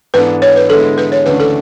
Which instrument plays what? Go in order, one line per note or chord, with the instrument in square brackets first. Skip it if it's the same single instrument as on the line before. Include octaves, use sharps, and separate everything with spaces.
[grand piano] G#2 E3 B3 D4 A4 [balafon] B4
[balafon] C#5
B4
[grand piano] D3 G#3 B3 E4 [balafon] A4
[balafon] B4
C#5
[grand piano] D2 C#3 E3 A3 D4 [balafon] B4
[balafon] A4